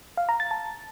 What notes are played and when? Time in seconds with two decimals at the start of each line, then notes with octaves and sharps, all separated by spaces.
0.17 F5
0.29 A#5
0.40 A6
0.51 A5